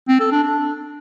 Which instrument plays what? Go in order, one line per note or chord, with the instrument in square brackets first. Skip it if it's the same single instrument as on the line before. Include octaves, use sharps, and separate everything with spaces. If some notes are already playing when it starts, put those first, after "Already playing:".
[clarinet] C4
A4
D4
D4